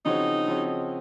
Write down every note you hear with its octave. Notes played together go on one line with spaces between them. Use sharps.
C#3 F3 C4 D#4 F#4 C#5
C#3 F3 C4 F#4 C#5